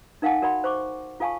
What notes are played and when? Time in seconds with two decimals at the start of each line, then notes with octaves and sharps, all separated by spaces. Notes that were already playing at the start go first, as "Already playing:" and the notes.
0.22 D#4 A#4 F5 F#5 G#5 A5
0.42 F#4 A#4 D5 F#5 B5 C6
0.64 C5 C#6 D6
1.20 F4 A4 F5 G#5 A5 C#6